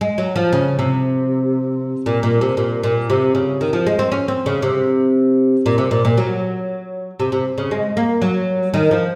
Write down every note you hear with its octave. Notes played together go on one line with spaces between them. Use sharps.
G#3
F#3
F3
C#3
C3
A#2
A#2
C3
A#2
A#2
C3
C#3
D#3
F3
G#3
C4
C#4
C4
C#3
C3
A#2
C3
A#2
A#2
F#3
C3
C3
C#3
G#3
A#3
F#3
D#3
F3